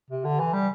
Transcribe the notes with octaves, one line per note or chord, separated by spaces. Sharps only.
C3
D3
E3
G3